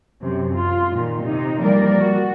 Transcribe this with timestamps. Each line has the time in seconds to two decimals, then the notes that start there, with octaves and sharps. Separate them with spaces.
0.22 F#2 C3
0.55 F4
0.92 A#2 D#3
1.25 C3 D#4
1.60 E3 F3 G3 A#3 A#4 D5
1.99 F#4